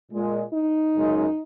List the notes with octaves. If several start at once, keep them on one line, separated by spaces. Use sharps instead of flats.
A#2 G#3
D#4
F#2 C#3 G#3